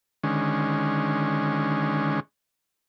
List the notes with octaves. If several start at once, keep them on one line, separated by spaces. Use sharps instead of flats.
D3 D#3 G#3 C#4